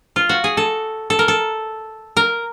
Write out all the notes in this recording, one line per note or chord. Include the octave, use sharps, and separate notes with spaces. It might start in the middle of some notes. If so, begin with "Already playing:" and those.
F4
F#4
G#4
A4
A4
A#4
A4
A#4